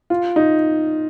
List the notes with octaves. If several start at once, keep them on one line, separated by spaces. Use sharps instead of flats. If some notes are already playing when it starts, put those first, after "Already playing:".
F4
D#4